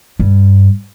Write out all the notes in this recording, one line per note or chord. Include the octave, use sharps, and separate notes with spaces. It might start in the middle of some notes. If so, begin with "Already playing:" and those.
G2